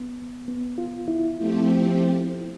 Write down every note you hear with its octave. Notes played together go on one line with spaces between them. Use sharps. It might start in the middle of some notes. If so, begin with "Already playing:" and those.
Already playing: B3
B3
F4
E4
F3 A3 C4 G4